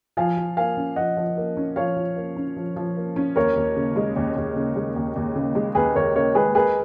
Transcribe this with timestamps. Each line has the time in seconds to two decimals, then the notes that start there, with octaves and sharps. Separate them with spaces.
0.17 F3 F5 G#5
0.37 F3
0.57 A#3 F5 G#5
0.77 C#4
0.96 F3 D#5 F#5
1.17 F3
1.37 A#3
1.57 C#4
1.76 F3 C#5 F5
1.96 F3
2.16 A#3
2.36 C#4
2.56 F3
2.76 F3
2.97 A#3
3.16 C#4
3.36 D#2 A#4 C#5
3.56 D#2
3.76 C#3
3.96 G#3
4.16 D#2
4.36 D#2
4.56 C#3
4.76 G#3
4.96 D#2
5.16 D#2
5.35 C#3
5.55 G#3
5.75 D#2 G#4 B4
5.95 D#2 A#4 C#5
6.15 C#3 A#4 C#5
6.35 G#3 G#4 B4
6.55 G#4 A#4 B4